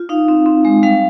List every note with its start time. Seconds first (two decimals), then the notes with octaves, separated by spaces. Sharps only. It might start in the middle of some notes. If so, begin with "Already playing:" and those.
Already playing: F4
0.09 D#4 F5
0.28 C4
0.46 C4
0.65 G#3
0.83 G3 F5